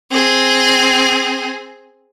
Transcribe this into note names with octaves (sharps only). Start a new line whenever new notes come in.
C4 G#4